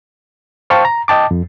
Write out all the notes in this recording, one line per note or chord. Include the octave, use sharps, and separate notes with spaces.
C5 F5 G5 A5 C#6
A#5
D#5 G5 A5 D6
F2